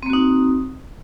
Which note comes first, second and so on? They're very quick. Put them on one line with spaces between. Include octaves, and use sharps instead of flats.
C4 A#3 F#4 D#4